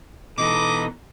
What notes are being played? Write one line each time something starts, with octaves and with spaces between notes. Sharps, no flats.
B2 E3 D#4 A4 D#5 D6